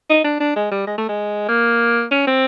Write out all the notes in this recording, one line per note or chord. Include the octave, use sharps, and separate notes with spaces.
D#4
D4
D4
G#3
G3
G#3
A3
G#3
A#3
C#4
C4